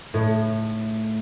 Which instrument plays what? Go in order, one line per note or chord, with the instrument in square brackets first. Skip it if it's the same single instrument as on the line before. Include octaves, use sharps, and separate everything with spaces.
[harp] A2